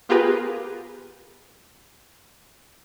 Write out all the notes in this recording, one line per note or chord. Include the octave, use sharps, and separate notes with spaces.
B3 F4 G4 G#4 A#4 B4